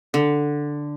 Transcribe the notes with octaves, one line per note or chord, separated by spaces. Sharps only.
D3